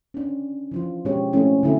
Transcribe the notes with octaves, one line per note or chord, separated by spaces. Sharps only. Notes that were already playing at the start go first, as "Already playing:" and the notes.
C#4 D4
E3 F3 F4
B2 G#3 C#4 D4 G4 C#5
F3 A3 C4 C#4 E4
D3 G3 C4 E4 F#4 A4